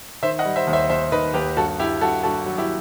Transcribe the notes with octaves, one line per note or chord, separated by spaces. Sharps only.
D#3 C5 E5
D#5 F#5
G3
C5 E5
D#2
C5 E5
D#2 C5 E5
D#3 B4 D#5
D#2 G4 B4
G2 F#4 A4
G2 E4 G4
G2 F#4 A4
G2 F#4 A4
F#3
E4 G4